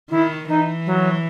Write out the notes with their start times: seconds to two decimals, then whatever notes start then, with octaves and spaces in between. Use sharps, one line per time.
0.10 D#3 E4
0.49 E3 D#4
0.86 F#3